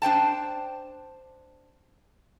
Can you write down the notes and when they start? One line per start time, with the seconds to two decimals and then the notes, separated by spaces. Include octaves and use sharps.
0.02 D4 C5 G5 A5